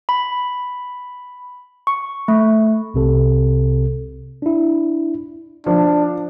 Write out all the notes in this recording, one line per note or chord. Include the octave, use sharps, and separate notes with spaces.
B5
C#6
A3
C2 C3 A4
D4 E4
F3 D4